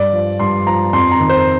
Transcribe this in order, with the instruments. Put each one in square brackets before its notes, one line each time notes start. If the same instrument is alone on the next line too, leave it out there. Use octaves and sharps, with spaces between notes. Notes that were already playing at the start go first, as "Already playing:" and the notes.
Already playing: [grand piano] G2 D5
F3
G2 C6
F3 A#5
F2 C6
A#5
D#3
C5